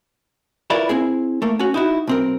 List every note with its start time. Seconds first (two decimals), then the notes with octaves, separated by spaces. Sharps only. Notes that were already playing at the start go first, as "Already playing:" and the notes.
0.70 E4 F4 A#4 B4 C#5 D5
0.89 C4 E4 G#4
1.42 A3 A#3
1.59 C#4 F#4
1.74 D#4 E4 F#4
2.07 B1 C4 A#4